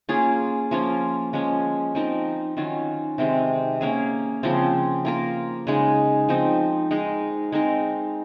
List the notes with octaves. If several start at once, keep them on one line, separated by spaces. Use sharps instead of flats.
A#3 C#4 F4 G#4
F3 A#3 C#4 F4
F3 G#3 C#4
F3 C4 D#4 A#4
D#3 F#3 C#4 F4
C3 D#3 G#3 C4
A#3 C#4 G#4
C#3 F3 C4 F4
A#3 F4 A#4
C#3 G#3 D#4
F3 C4 D#4
G#3 D#4 A#4
G#3 C4 D#4 A#4